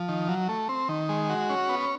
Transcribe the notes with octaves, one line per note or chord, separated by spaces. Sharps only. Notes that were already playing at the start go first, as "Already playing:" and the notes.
Already playing: F3
D#3
F#3
A3
C4
D#3
G#3
F#4
C#4
B3